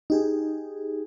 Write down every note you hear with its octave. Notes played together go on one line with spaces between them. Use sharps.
D#4 G4 G#4